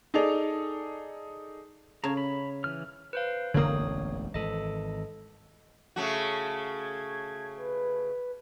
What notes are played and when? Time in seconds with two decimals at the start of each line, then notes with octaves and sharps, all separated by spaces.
0.14 D#4 G#4 A4 D5 F7
2.04 C#3 C#5 A5 A#5
2.17 B5
2.64 E3 F6
3.13 B4 C5 F5
3.54 E1 A1 F#2 D3 A#3 C#5 D#6
4.34 G#1 E3 A4 D#5
5.96 C#3 A3 F#4
6.77 G#6
7.57 B4